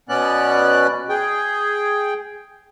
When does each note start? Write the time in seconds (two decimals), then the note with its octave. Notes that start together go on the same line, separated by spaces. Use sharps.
0.09 B2 B3 C#4 D5 F#6
1.09 G#4 G5